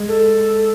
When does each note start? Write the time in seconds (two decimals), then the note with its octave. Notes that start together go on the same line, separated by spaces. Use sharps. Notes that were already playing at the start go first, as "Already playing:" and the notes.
Already playing: G#3
0.08 A4